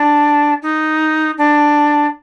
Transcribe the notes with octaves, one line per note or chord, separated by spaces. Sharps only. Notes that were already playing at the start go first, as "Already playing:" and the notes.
Already playing: D4
D#4
D4